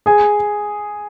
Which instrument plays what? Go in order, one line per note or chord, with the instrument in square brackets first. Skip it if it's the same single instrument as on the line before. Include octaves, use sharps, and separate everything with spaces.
[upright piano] G#4 G#5